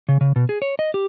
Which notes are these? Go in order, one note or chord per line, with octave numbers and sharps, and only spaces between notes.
C#3
C#3
B2
G#4
C#5
D#5
G4